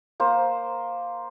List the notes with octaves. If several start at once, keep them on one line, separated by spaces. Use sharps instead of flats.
A#3 C5